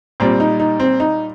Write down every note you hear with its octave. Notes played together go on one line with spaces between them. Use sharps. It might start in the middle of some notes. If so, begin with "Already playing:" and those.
A#2 G3 C4
D#4
D#4
C4
D#4